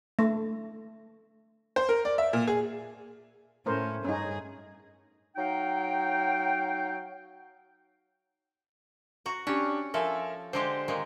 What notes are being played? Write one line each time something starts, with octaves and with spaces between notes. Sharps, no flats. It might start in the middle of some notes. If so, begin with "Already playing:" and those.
A3
C5
A#4
D5
E5
A#2
G#4
A2 A3 C#4 A#4 C5
G2 C#4 D#4 G#4
F#3 D#4 F5 G5
F#4 A#5
C#4 D4 G4
F3 A4 A#4 E5 G#5
D3 G#3 G4 C5 C6
A#2 D#3 G#3